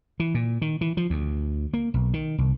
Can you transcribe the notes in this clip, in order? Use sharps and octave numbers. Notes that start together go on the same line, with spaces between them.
E3
A#2
D#3
E3
F3
D2
A#3
B1
D#3
C2